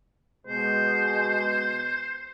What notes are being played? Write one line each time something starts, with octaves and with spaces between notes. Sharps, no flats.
B2 G#3 C5